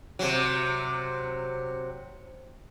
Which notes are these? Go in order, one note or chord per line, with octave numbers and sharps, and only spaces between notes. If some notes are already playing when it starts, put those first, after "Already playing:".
C3 F#3